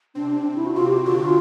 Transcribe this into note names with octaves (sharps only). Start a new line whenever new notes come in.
C3 C4 D4
D4
E4
F#4
C3 C4 F4
G4
F#4
D3 D4 F4
F#4
F4